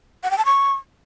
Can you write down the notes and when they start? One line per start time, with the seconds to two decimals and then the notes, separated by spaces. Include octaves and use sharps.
0.23 F#5
0.31 G5
0.38 A5
0.45 C#6